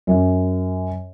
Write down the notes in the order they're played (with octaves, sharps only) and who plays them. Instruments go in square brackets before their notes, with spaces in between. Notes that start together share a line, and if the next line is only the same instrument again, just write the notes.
[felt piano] F#2